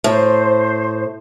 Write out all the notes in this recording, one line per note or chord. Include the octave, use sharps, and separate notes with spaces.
A2 C5